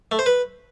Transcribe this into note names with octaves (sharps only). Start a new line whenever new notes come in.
A3
C5
B4